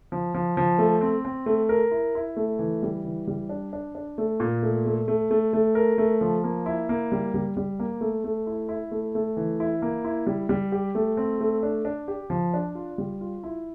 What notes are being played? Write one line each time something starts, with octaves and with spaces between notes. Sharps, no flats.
F3
F3
F3
A3
C4
C4
A3
A#4
E4
E4
A3
E3
G3
E3
G3
D4
D4
D4
A3
A#2
A3
A3
A3
A3
A3
A#4
A3
F3
A#3
E4
A#3
G3
G3
G3
A#3
A3
A3
E4
E4
A3
A3
E3
E4
A#3
E4
G3
G3
G4
A3
C4
A3
D4
D4
G4
F3
D4
F4
G3
F4
E4